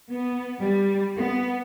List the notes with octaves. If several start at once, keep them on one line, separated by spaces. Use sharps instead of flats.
B3
G3
B3